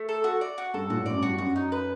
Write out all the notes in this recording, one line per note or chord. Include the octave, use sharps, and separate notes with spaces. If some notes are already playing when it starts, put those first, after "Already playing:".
Already playing: A3
A4
F#4
D5
F#4
G2 A4
A#2 F#4
A2
F#2 D5
G2
F#4
F#2 F#4
D#4
B4